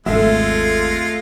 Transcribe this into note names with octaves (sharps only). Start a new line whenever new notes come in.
G#1 D#2 G#3 A3 F4 E5